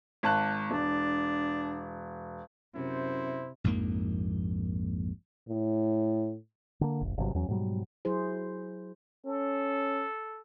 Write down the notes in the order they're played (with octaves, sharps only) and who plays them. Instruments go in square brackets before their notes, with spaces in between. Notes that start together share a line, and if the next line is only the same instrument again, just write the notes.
[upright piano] G#1 A5 F#6
[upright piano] E1 [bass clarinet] D4
[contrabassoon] F#2 [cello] C3 [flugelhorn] E4 [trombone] C5
[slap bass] A#1 F2 G#2 A#3
[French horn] A2
[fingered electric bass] D3 A#3
F1 A#1
G1 C3 F#3
E2 F#3 C#4
G#2 B2 F#3 G3
[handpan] F#3 E4 G#4 C5
[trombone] C#4 [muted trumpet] A4